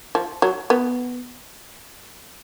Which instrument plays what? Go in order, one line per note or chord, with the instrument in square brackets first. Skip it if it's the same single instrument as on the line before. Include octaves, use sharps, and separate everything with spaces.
[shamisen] F3
F#3
B3